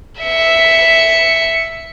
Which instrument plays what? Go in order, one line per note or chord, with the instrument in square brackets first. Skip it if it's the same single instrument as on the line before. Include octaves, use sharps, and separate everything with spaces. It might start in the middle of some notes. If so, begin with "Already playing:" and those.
[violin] E5 C#7